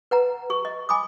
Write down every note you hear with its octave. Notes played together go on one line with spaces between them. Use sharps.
B4 F#5 A#5
G#4 C#6
D#5
G#5 B5 D6 D#6